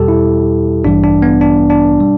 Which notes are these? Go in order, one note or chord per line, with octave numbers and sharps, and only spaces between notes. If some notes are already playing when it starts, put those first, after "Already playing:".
Already playing: E2 B2 G3 G4 A4
E4
A1 G2 E3 G3 D4
D4
B3
D4
D4
B2 G3